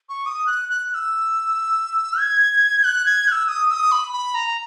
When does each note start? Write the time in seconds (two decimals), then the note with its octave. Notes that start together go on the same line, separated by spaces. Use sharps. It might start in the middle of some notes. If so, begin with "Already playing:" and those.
0.09 C#6
0.26 D#6
0.47 F#6
0.69 F#6
0.90 F#6
0.94 E6
2.19 G#6
2.84 F#6
3.06 G#6
3.27 F#6
3.32 E6
3.48 D#6
3.70 E6
3.74 D#6
3.92 B5
4.13 B5
4.35 A#5